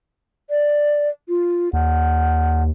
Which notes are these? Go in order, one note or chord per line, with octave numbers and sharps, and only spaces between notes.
D5
F4
D#2 F#5